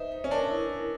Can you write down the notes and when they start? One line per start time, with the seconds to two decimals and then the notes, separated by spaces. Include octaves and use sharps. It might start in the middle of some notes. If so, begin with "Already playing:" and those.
Already playing: D#4 B4 C5 E5
0.12 B4
0.24 C#4
0.31 D4 A#4
0.50 E4
0.70 A#4